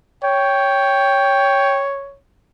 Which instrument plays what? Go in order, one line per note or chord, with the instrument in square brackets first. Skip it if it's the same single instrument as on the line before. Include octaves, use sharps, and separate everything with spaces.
[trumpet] C#5 [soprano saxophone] G5